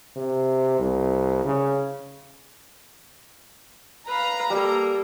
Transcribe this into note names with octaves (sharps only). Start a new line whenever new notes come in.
C3
C2
C#3
B4 F5 A#5
G3 A#3 A4